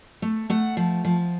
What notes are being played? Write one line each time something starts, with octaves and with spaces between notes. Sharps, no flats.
A3
A3 F#5
F3
F3